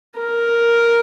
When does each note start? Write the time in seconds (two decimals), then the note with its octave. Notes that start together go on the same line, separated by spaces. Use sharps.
0.17 A#4